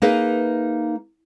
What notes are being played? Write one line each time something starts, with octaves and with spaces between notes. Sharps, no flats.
A#3 D#4 G#4 B4 E5